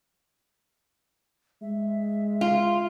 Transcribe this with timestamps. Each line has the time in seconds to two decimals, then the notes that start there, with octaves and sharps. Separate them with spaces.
1.62 G#3 E5
2.41 F4